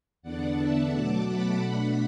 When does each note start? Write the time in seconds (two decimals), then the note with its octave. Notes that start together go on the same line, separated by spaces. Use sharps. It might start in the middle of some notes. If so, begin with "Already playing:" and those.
0.22 E2 D3 B3 D4 D5 F#5
0.57 E5 A5
0.91 B2 F#3 A3 A5 D6
1.25 F#5 B5
1.59 B2 A3 D4 F#5 B5